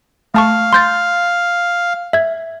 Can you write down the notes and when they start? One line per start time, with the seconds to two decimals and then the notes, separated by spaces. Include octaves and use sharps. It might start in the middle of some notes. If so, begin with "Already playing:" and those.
0.34 A3 F5 A5 C#6
0.73 C6 G6 A6
2.13 E5 G#6